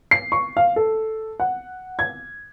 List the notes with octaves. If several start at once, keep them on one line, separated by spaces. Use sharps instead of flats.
C7
C#6
F5
A4
F#5
G#6